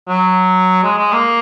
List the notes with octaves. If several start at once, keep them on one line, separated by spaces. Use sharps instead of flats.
F#3
G#3
G#3
A#3